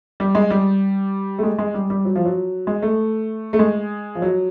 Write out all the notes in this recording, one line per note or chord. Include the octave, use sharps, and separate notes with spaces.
G3
G#3
G3
A3
G#3
G#3
G3
G3
F#3
F3
F#3
G#3
A3
A3
G#3
F3
F#3